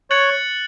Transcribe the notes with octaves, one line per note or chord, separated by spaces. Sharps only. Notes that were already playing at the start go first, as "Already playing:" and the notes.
C#5 F#6 A6 C#7 F#7